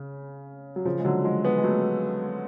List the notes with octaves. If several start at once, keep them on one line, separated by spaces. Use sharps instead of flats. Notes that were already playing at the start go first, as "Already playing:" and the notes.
Already playing: C#3
F#3
C#3 F3
G#3
D3 F#3
F3 G#3
G#3 B3
G#3
F#3 A3